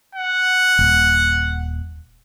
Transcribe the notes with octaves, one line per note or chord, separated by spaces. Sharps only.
F#5
D#1